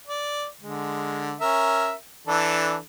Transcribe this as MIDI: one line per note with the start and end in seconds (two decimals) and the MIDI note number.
0.07 0.47 74
0.61 1.36 50
0.61 1.36 56
1.41 1.93 61
1.41 1.93 70
1.41 1.93 76
2.27 2.79 52
2.27 2.79 62
2.27 2.79 69